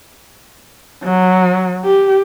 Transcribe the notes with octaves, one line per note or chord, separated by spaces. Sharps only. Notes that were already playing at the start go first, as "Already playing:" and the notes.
F#3
G4